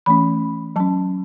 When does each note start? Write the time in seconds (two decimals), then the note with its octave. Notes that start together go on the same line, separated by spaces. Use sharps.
0.06 E3 A3 C#4 B5
0.76 F#3 C#4 A5